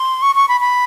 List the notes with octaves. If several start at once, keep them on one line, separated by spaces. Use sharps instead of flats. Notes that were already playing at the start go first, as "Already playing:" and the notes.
Already playing: C6
C#6
C#6
B5
B5